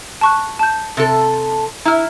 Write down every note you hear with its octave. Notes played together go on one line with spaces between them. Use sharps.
A5 C#6 F#6
A5 G6
C3 A4
E4 A#5 F6